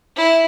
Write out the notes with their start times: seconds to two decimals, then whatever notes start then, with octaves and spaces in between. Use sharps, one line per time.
0.16 E4